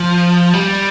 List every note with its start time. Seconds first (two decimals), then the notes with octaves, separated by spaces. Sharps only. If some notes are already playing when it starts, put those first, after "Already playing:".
Already playing: F3
0.53 G3